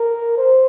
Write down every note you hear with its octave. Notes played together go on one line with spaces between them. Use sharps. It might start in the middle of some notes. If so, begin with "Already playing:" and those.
Already playing: A#4
C5